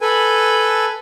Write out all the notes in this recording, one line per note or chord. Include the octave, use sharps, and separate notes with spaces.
A4 B4 G#5